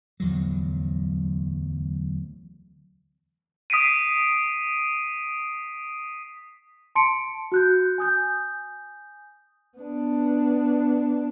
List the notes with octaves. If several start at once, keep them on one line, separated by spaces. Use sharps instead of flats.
D1 E2 F3 F#3
D#6 B6 C7 D7 D#7
A5 C6 C#7 D7
F#4 F#6 G6
G#5 D#6 G6
B3 D4